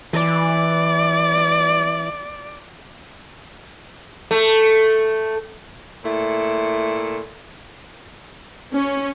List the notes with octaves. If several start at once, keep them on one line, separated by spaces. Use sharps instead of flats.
E3 D5
A3
A#2 A3 E4
C#4